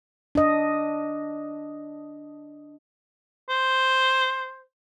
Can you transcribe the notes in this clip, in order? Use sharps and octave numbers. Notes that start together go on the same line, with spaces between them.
D4 D#5
C5